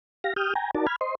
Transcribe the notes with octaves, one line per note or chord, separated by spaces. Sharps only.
G4 F5 A#6
G4 D#6 F6 G6
G5 G#5 A#5
D#4 F#4 A#4 D5 A5
B5 F6 G#6
C5 D#5 C6